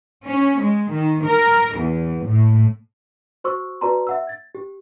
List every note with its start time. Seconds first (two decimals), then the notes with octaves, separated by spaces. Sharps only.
0.25 C#4
0.61 G#3
0.92 D#3
1.25 A#4
1.77 E2
2.25 A2
3.44 F#4 C5 C6 C#6 E6
3.81 F#4 B4 D5 A5 A#5 C6
4.07 E5 F#5 E6
4.27 G#6 A6
4.55 G4